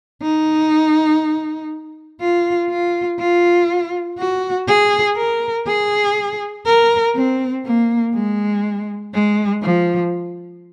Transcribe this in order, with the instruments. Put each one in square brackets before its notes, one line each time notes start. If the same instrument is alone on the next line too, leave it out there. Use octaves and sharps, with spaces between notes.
[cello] D#4
F4
F4
F4
F#4
G#4
A#4
G#4
A#4
C4
A#3
G#3
G#3
F3